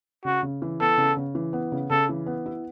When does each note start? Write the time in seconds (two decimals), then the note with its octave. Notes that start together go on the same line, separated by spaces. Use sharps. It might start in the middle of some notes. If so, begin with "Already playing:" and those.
0.25 C#3 F#4
0.43 C#3
0.62 E3
0.80 B3 A4
0.98 C#3
1.17 C#3
1.35 E3
1.53 B3
1.72 C#3
1.90 C#3 A4
2.09 E3
2.26 B3
2.46 E4